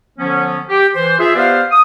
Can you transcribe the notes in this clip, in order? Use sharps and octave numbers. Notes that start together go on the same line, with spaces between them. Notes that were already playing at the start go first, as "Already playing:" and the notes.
D3 F3 B3 C#4
G4
E3 C5
F4 G#4 E5
B3 G4 B4 C5 D5 F5
D#6